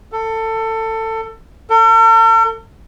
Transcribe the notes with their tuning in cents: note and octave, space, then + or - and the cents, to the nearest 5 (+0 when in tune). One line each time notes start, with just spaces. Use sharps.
A4 +20
A4 +45